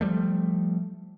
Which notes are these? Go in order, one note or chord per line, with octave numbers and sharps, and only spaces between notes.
F3 G3 A3